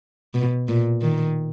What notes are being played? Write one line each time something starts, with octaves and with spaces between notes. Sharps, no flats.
B2
A#2
D#3